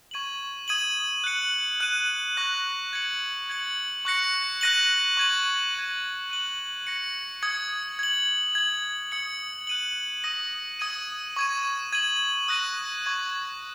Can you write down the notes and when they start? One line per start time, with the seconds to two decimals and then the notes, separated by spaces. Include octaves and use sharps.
0.11 C#6 G#6 D#7 F#7
0.68 D#6 G#6 D#7 F#7
1.24 F#6 C#7 F#7
1.80 F#6 D#7 F#7
2.37 C#6 F#6 A#6
2.93 G#6 C#7 F#7
3.49 G#6 C#7 F#7
4.05 C#6 F#6 A#6 C#7
4.61 F#6 A#6 D#7 F#7
5.17 C#6 G#6 D#7 F#7
5.75 G#6 D#7 F#7
6.30 F#6 D#7 F#7
6.87 C#6 A#6 C#7
7.42 D#6 G#6 C#7
7.99 G#6 F#7
8.55 G#6 F#7
9.12 D#6 G#6 C#7 F#7
9.67 F#6 D#7 F#7
10.24 D#6 A#6 D#7
10.79 D#6 G#6 D#7
11.37 C#6 G#6 D#7
11.93 G#6 D#7 F#7
12.48 D#6 F#6 A#6 D#7 F#7
13.05 C#6 G#6 D#7